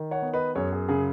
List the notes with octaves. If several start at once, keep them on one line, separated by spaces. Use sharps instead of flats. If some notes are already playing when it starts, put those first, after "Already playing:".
Already playing: D#3
C#5 F#5
B3
B4 D#5
F#2 G#4 C#5
G#4
C#3 G#4